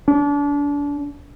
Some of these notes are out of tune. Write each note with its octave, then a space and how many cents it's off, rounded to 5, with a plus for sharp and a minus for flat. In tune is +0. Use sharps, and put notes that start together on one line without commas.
D4 -30